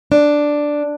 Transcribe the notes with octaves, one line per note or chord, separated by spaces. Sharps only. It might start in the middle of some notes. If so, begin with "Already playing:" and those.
D4